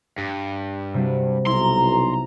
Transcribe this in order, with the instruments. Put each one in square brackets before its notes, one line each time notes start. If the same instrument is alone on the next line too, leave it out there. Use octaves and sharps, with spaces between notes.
[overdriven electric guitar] G2
[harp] C3 G3 F#4
[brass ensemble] B1 A#5 [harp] E4 [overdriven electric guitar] C6